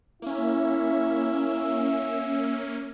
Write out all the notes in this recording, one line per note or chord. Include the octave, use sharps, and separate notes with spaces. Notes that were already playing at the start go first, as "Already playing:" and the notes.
A#3 C#4 E4 E5